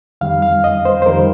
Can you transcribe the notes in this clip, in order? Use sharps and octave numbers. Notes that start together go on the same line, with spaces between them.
F2 D#3 G3 F5
F5
D#5
C5
C5
F2 D#3 G3 A#4